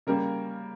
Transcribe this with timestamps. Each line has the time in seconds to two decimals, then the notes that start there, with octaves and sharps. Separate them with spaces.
0.07 C#3 G3 A#3 A#4